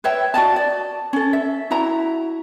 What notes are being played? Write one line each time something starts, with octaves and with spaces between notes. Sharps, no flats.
B4 C#5 E5 G5
F#4 D5 D#5 A5
D5
C#4 A4
E5
E4 F#4 E5 A#5